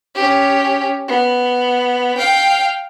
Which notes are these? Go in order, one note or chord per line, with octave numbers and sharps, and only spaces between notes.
C#4 G4
B3
F5 G5